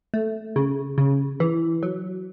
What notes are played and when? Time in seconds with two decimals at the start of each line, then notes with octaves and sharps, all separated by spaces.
0.14 A3
0.56 C#3
0.98 C#3
1.40 E3
1.83 F#3